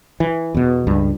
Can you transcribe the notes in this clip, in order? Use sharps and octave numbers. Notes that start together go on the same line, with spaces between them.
E3
E2 B2
C#2 G2